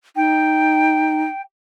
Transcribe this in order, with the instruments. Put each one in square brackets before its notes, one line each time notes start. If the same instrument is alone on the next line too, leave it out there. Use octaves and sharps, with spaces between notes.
[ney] D#4 [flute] G5